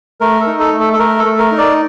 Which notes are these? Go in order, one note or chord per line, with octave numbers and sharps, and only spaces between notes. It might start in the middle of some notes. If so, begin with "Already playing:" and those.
A3 A#4
A4
D#4
A4
A3
A4
A4
A3 A#4
A4
A3
A#4
D#4
D5